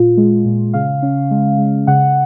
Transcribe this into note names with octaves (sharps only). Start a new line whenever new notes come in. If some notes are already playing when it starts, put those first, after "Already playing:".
Already playing: A#2 F4
G#3
A#2
C#3 F5
C#4
G#3
G#3
C#3 F#5